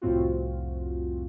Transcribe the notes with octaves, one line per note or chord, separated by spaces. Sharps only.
C2 F2 A2 C4 F4 F#4